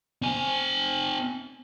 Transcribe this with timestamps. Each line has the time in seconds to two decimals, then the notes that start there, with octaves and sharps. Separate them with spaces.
0.22 C4 G#5